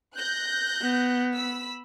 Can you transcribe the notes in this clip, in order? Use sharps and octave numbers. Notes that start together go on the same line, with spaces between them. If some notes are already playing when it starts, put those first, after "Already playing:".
F#6 G6 A#6
B3
B5 E6 B6